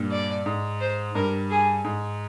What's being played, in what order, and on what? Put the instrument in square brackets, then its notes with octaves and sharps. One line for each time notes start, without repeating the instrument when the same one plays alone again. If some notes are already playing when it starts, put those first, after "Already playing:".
Already playing: [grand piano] G2 A#2
[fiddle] D5
[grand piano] G#2
[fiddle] C5
[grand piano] G2 [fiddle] A#4
[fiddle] G#4
[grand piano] G#2